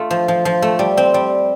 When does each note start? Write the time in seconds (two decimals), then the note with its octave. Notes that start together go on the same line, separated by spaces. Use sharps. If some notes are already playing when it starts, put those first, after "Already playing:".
Already playing: A3 F4
0.11 F3
0.28 F3
0.45 F3
0.62 A3
0.79 G3
0.97 C4
1.14 G3